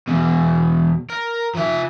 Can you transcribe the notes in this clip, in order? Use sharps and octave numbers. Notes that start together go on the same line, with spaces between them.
E2 B2
A#4
F3 E5